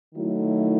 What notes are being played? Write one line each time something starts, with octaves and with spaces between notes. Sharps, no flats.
D#3 F#3 A3 E4